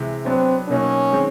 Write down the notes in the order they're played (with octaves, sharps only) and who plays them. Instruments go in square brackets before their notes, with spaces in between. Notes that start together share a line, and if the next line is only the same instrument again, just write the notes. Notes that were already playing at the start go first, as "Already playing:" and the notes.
Already playing: [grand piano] C3 E3 G#3
[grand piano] F#3 B3 D4 [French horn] C4
[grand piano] B2 F#3 A#3 D#4 [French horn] C#4
[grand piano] D#3 G#3 C4